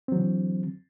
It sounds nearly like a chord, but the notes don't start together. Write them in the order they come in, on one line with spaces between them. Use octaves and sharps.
C4 F#3 E3 D3